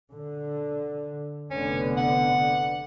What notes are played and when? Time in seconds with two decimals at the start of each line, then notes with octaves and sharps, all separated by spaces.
0.14 D3
1.51 F1 D3 B3 C#4
1.97 F#5